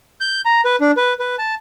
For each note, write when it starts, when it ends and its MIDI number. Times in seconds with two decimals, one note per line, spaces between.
0.21 0.41 91
0.45 0.61 82
0.65 0.76 71
0.81 0.92 62
0.97 1.14 71
1.20 1.36 71
1.39 1.55 81